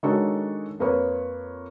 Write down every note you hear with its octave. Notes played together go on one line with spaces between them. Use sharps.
D#3 G#3 D4 F#4 A4 C#5
F2 A#3 B4 C#5